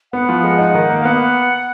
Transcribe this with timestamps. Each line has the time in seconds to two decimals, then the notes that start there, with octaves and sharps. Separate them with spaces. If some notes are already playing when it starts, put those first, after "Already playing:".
0.12 B3 F#5
0.29 F3
0.44 G#3
0.58 D#4
0.75 D#3
0.90 A#3
0.99 F5
1.05 B3 F#5